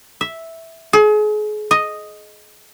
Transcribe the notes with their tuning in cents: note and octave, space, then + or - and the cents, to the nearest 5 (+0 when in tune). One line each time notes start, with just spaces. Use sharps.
E5 -5
G#4 +35
D#5 +0